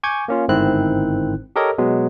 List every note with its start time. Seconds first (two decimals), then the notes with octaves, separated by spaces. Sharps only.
0.03 G#5 C#6 D6 G6 G#6
0.28 A#3 C#4 F4
0.48 G1 G#2 D#3 C4 E4 F#6
1.56 G4 A4 A#4 C#5 D#5
1.78 B2 F#3 G#3 B3